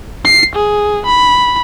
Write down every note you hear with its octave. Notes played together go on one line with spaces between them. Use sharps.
C7
G#4
B5